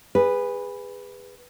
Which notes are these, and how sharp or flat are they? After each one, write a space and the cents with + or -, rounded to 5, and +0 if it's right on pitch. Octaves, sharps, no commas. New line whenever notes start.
G#4 -25 B4 +0